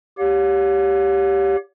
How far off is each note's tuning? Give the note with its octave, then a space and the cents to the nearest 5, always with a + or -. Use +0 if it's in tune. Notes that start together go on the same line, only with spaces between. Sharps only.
G4 +0 C#5 +35 F5 +45